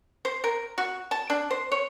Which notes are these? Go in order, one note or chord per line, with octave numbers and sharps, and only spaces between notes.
C5
A#4
F#4
A5
D4
C5
C#5